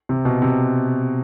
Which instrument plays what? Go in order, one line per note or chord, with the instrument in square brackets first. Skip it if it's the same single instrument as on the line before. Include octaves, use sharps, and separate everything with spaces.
[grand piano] C3
B2
C3